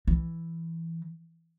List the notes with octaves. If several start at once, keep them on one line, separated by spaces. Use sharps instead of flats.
E3